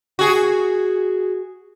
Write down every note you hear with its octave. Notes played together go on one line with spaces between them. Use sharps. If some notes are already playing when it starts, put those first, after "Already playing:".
F#4 G#4